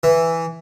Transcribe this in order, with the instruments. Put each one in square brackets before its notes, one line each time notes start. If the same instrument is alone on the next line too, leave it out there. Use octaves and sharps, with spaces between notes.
[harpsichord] E3